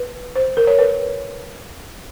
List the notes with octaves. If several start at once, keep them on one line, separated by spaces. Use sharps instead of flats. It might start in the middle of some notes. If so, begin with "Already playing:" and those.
Already playing: B4
C5
A#4
C#5
B4